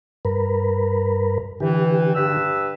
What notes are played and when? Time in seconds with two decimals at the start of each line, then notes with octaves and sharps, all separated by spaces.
0.25 G2 A#4 B4
1.60 D3 E3 G4
2.15 G2 B4 E6